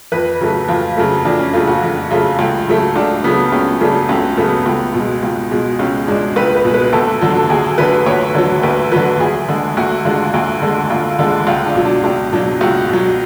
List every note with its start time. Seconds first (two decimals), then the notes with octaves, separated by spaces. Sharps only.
0.12 F2 B4
0.41 C#3 F#3 A3
0.69 F2 F4
0.97 C#3 F#3 A3
1.25 F2 D4
1.39 C#4
1.53 C#3 F#3 A3 F4
1.67 F#4
1.82 F2
2.11 C#3 F#3 A3 F4
2.39 C#2
2.67 C#3 F#3 A3
2.96 C#2 D4
3.24 C#3 F#3 A3 B3
3.52 C#2 C#4
3.81 C#3 F#3 A3 D4
4.09 C#2 C#4
4.37 C#3 F#3 A3 B3
4.66 C#2
4.94 B2 G#3
5.23 C#2
5.51 B2 G#3
5.79 C#2 C#4
6.08 B2 G#3 D4
6.36 C#2 B4
6.55 B4
6.65 B2 G#3
6.74 B4
6.93 D2 A4
7.21 D3 F#3
7.38 A4
7.50 D2 G#4
7.78 D3 F#3 B4
8.06 D2 C#5
8.35 D3 F#3
8.63 D2 B4
8.92 D3 F#3 B4
9.20 D2 G#4
9.48 D3 G#3
9.77 D2 F#4
10.05 D3 G#3 F4
10.34 D2
10.62 D3 G#3
10.90 D2 F4
11.19 D3 G#3
11.47 C#2 F4
11.66 D4
11.75 B2 F#3
11.85 D4
12.04 C#2 D4
12.32 B2 F#3 D4
12.61 C#2 F#4
12.89 B2 F#3